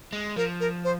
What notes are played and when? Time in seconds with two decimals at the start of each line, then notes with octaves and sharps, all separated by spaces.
0.13 G#3
0.36 F3 A#4
0.60 A#4
0.84 C5